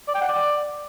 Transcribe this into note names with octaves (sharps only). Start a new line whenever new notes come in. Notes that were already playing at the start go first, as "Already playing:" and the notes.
D5
G5
F#5
D5